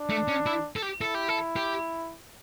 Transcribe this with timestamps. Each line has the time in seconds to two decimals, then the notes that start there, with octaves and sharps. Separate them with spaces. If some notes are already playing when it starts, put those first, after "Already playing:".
Already playing: D4
0.10 A3
0.28 C#4
0.46 E4
0.76 A4
0.82 G4
1.01 E4 A4
1.15 G4
1.29 A4
1.56 G4